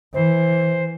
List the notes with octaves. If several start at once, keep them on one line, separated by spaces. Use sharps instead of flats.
E3 C5